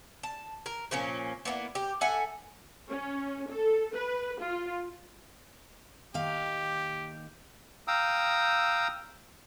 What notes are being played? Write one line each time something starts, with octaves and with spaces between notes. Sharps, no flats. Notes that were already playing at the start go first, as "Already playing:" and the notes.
A5
A#4
A#2 F3 A#3 C#4
A#3 B3 C#4 E4
G4
A4 E5 F#5 G#5
C#4
A4
B4
F4
D#3 A#3 G4 F5
F5 G5 A#5 D#6 E6